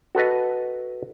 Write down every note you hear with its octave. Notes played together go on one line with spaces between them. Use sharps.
F#4 A4 B4 D#5